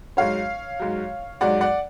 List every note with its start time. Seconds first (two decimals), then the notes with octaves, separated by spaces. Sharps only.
0.17 G#2 F#3 C#5 F5
0.80 G#2 F#3
1.41 G#2 F#3 D5 F#5
1.61 D5 F#5